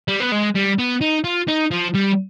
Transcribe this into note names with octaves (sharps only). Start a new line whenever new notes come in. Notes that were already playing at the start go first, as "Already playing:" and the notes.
G3
B3
G#3
G3
B3
D#4
F4
D#4
F3
G3